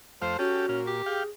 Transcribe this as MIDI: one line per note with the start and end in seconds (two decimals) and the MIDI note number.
0.22 0.37 41
0.22 0.37 57
0.22 0.35 72
0.22 0.37 77
0.39 0.65 61
0.39 0.92 66
0.39 0.66 67
0.39 0.66 69
0.69 1.02 46
0.69 0.81 61
0.87 1.22 67
1.06 1.28 68
1.06 1.23 77
1.06 1.23 79